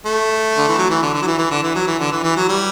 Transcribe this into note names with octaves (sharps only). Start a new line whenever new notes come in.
A3
D3
E3
F#3
E3
D3
D3
F#3
E3
E3
D3
E3
F#3
E3
D3
E3
E3
F#3
G3